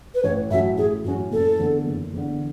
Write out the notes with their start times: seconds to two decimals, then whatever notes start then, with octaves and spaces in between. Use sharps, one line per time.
0.14 B4
0.23 A1 C#5
0.50 A2 F#3 C#4 E5
0.77 A1 G#4
1.04 A2 F#3 C#4 F#4
1.32 F#1 A4
1.59 E2 D3
1.87 F#1
2.13 E2 D3